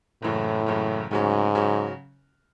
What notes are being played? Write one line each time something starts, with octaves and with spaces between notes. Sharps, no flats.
F#1 F#2 A2 C#3 E3
F#1 F#2 C#3 E3
D2 G#2 C#3 F#3 C#4
C#3 F#3 C#4